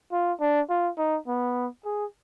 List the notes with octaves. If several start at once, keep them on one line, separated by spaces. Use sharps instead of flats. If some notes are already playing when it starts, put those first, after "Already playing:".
F4
D4
F4
D#4
B3
G#4